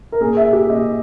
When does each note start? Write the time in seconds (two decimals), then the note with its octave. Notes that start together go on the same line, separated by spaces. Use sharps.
0.12 A#4
0.21 A#2 G#4
0.37 E5
0.53 G4
0.70 A#2 D#5